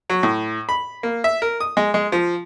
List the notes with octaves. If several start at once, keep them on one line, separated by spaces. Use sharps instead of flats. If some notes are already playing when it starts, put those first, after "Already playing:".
F#3
A2
B5
A#3
E5
A#4
D#6
G#3
G#3
F3